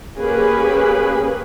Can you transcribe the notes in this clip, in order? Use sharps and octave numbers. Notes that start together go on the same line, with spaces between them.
A#3 C#4 G4 G#4 B4